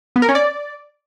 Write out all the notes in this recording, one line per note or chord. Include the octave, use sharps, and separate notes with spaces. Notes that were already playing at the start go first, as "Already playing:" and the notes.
B3
A#4
C#4
D5